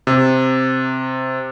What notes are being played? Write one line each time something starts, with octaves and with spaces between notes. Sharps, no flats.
C3